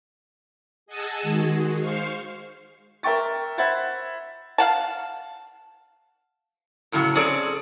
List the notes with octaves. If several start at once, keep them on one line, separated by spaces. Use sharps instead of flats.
G#4 D#5 F#5 G#5 A5 E6
D#3 G#3 F#4 G#4
C5 F5 C#6 C7
A#4 E5 G5 C#6 A6
C5 E5 F#5 B5 G#6 A6
F5 F#5 A5
F#2 A2 C#3 F#3
C4 C#4 G#4 A4 C#5 D5